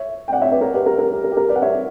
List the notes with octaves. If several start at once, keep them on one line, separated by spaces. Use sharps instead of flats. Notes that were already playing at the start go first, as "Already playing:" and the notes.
Already playing: C#5 E5
G5
D5 F#5
C#5 E5
B4 D5
A#4 C#5
G4 B4
A#4
A#4
G4
A#4
G4
A#4
B4 D5
F#5
C#5 E5